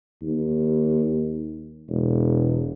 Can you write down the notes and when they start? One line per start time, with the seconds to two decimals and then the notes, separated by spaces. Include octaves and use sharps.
0.22 D#2
1.89 E1